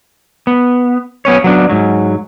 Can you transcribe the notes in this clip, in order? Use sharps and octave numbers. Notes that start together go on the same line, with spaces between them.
B3
F#3 B3 C#4 C#5
F#3 B3 D4
G#2 F#3